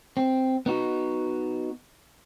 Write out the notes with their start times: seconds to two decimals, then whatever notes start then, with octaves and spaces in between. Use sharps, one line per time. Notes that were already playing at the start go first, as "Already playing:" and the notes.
0.17 C4
0.66 B3 D#4 F#4